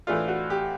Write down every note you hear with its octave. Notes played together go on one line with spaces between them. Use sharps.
A2 E3 A3 D4 F4
F#4
G4